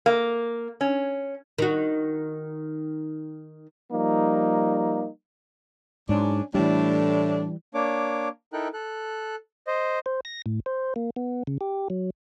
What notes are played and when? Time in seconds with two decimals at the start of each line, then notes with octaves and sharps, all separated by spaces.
0.06 A#3
0.81 C#4
1.58 D#3 F#4
3.91 F3 G3 A#3 D#4
6.09 G#2 F#3 C#4 D4
6.55 A2 E3 G3 D4
7.74 A#3 D4 C#5 D6
8.53 D#4 E4 A4 A#4 G5 F#6
8.74 A4 F#6
9.67 C5 D#5
10.06 C5
10.25 A#6
10.46 A2
10.66 C5
10.96 A#3
11.16 B3
11.47 C#3
11.61 G4
11.90 F#3